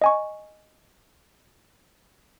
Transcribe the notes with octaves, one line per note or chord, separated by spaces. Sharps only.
D#5 G#5 C#6